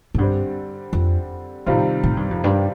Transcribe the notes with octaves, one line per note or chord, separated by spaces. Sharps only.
A2
G2 D3 G3 C4
F2
A2 C3 D#3 G3 C4 F4
A2
G2
F2
G2